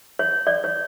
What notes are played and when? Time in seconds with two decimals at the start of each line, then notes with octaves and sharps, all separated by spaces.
0.19 C#5
0.47 D5
0.64 C#5